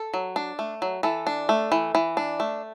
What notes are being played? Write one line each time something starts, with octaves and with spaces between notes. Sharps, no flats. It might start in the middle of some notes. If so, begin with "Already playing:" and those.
Already playing: A4
F#3
D4
A3
F#3
E3 A4
D4
A3
E3
E3
D4
A3